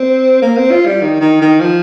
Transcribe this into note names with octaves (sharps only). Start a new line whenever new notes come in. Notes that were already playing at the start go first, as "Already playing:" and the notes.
Already playing: C4
A#3
C4
F4
G3
D#3
D#3
D#3
F3